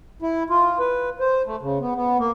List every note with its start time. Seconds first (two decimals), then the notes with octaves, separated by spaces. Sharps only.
0.22 E4
0.50 F4
0.79 B4
1.20 C5
1.46 A3
1.62 C#3
1.80 B3
1.95 B3
2.19 A#3